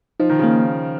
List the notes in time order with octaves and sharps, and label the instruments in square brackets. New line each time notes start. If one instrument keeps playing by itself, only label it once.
[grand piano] F3 [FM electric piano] D#4
[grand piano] D#3
[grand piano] C#3 [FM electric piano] A#3